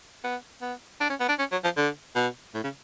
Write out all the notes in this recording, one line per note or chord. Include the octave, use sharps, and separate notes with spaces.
B3
B3
D4
C#4
B3
D4
C#4
F#3
F3
D3
B2
A2
C#3